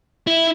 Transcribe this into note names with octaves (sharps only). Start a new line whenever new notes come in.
E4